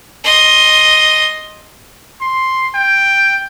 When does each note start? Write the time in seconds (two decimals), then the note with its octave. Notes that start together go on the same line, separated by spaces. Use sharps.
0.24 D#5 C6
2.21 C6
2.75 G5